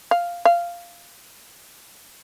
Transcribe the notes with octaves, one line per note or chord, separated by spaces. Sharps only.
F5
F5